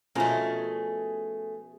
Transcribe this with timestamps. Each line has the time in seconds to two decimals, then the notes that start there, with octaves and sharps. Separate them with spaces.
0.15 B2 F3 A3 C#4 G#4 A#4